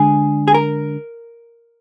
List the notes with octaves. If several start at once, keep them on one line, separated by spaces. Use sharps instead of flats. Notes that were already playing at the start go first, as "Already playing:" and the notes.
Already playing: D3 G#3 D4 G#4
G#4
A#4